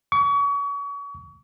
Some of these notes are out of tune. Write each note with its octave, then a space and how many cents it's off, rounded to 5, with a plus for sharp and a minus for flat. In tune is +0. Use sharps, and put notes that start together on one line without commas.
C#6 +35